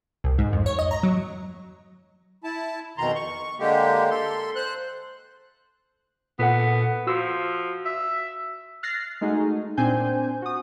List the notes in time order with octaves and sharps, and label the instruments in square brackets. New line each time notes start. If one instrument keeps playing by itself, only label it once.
[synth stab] C2
G#2
F2
C#5
D#5
A#5
F#3
[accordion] E4 A5
F2 B2 D#3 A#5 C6
C#6
D3 G#3 A#3 G4
A4 C6
C5 F#6
[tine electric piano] A#2 A4 F#5 [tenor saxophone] B3
[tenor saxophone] F3 [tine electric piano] F#4 E6
[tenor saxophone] E5
[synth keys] F6 F#6 A6 A#6 C7
G#3 A3 D#4 F#4 G#4
A#2 C4 D4 C5 G#5 G6
F#4 D#6